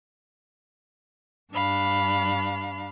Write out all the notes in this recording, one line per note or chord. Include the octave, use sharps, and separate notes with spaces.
G2 D4 F5 B5